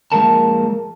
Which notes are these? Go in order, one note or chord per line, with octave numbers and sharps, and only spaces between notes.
F3 G#3 A#3 A#4 A5